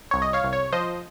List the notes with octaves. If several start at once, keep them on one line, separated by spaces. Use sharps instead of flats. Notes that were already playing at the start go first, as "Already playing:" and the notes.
C2 C#5
D#5
C#5 F5
C2
C#5
F3 C5 D#5